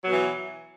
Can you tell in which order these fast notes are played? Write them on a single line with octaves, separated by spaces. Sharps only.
F#3 B2 E3